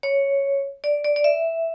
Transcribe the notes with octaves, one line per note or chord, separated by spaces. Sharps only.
C#5
D5
D5
D5
E5